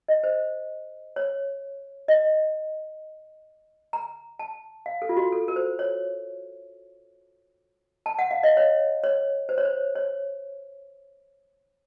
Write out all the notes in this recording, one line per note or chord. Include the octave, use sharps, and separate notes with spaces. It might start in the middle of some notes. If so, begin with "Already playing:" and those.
D#5
C5
C#5
D#5
A#5
A5
F5
A4
F4
F#4
A4
A#4
C5
C#5
A5
F#5
F5
D#5
C#5
C#5
C5
C#5
C5
C#5